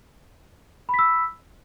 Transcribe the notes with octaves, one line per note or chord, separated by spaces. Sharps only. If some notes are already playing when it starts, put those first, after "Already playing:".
B5 E6 B6